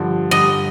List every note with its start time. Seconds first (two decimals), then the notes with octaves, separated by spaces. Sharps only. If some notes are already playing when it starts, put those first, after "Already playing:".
Already playing: G2 D3 F3
0.31 G2 D3 G3 D#5